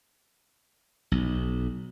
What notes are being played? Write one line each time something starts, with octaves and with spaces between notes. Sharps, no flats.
B1